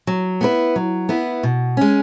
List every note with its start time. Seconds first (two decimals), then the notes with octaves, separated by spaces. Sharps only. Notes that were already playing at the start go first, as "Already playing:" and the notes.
0.07 F#3
0.41 B3 E4 B4
0.76 F#3
1.09 B3 E4 B4
1.43 B2
1.77 G#3 C#4